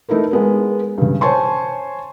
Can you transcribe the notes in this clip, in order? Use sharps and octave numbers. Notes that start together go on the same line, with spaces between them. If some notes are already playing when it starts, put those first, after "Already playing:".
A3 D#4 E4 A#4 B4
G#3 B3 A#4
G2 C#3
C5 C#5 G#5 A5 C6 C#6